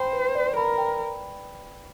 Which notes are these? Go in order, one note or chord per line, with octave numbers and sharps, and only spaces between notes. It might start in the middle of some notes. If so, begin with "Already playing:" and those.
Already playing: C5 G5 B5
B4
D5
A#4 B5
G5